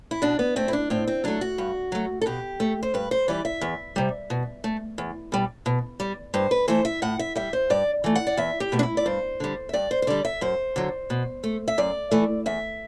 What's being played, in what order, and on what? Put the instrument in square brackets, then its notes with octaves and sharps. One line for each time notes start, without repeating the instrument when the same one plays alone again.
[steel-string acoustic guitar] E4
B2 D4
B3
A3 C4
E4
D4
A2 C4
C4
F#3 A3 D4
F#4
G2
F#3 A3
A4
B2 G4
A3
C5
G2 B4
C5
E3 G3 D5
E5
E2
C3 G3
B2
A3
E2
B2 G3
B2
G3
G2 C5
B4
E3 A3 C5
E5
A2 F#5
E5
G3 E5
C5
G2 D5
E3 A3
F#5
D5
E2 E5
G4
B2 A3
D4
E4
D5
G2 C5
D3 G3
E5
G2 D5
C5
C5
D3 G3 D5
E5
F#2 C5
D3 F#3
B2
A3
E5
F#2 D5
E3 A3
E2 E5